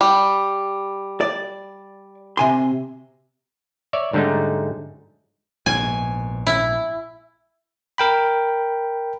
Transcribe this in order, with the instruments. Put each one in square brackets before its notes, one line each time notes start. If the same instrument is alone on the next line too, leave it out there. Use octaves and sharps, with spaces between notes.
[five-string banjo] G3
[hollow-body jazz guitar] D5
C3 G#5 C6
[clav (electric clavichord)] C#5 D5 E5
G#2 D3 G3 A3 C#4 D#4
[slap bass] A#1 G#2 B2 [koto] G#5
[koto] E4
[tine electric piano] A#4 G5 B5